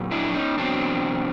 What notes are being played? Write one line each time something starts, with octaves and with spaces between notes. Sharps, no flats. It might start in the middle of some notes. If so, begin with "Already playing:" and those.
Already playing: A#2 F#3
D4 E4
C#4 D#4
E2 B2 F#3 C4 D4